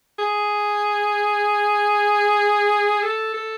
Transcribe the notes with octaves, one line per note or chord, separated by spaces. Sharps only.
G#4
A4
A4